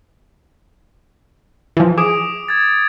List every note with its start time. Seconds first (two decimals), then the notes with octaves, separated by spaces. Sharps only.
1.77 E3 F3
1.98 G#4 D6 D#6 D7
2.48 G#6 A6